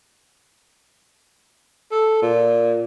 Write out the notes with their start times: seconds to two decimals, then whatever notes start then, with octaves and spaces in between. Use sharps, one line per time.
1.91 A4
2.22 A#2